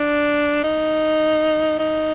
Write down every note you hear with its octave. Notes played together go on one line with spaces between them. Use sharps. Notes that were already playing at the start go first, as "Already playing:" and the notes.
Already playing: D4
D#4
D#4